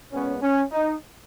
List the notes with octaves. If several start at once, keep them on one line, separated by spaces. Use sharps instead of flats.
A#2 G#3 B3 C#4
C#4
D#4